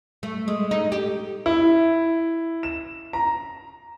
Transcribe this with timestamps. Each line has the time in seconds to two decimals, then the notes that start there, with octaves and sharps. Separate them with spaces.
0.23 A3
0.48 G#3
0.71 D#4
0.92 G4
1.46 E4
2.63 E7
3.13 A#5